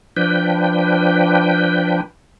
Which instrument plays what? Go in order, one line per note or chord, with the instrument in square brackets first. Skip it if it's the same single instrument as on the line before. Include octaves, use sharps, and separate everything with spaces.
[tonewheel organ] F3 D4 B4 G5